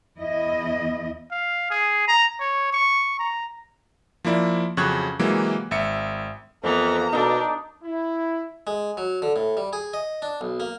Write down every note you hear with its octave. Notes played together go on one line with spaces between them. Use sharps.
E2 E4 D#5
F5
G#4
A#5
C#5
C#6
A#5
F3 A#3 E4 D5
F2 C#3 F#3 C#6 F#6 G#6
C3 E3 F#3 G#3 A#3
G#1 E5 C#7
F2 E3 A#3 B3 A#5
B2 D4 D#4 A4 A5
E4
G#3
F#3
D3
A2
G3
G#4
D#5
D4
B1
A#3